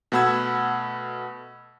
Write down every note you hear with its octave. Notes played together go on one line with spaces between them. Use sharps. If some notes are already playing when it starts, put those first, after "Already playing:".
B2 A3 F#5 B5 E6 G#6